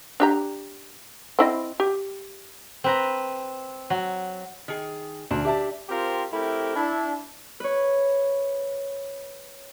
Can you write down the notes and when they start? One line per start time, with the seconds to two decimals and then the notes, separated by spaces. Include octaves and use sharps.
0.20 D4 G4 A#5
1.39 C4 E4 D#5
1.80 G4
2.84 C4 B4 A#5
3.90 F#3 F#4
4.68 D#3 G#4
5.31 D2 D4
5.45 G4 E5 A5
5.89 C4 F4 G4 A#4 C5
6.33 A3 C4 E4 G4 A#4
6.76 D4 E4
7.60 B4 C#5